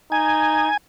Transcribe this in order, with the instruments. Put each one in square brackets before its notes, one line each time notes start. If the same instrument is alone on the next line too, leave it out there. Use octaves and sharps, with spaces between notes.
[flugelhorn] D#4 [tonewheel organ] G#5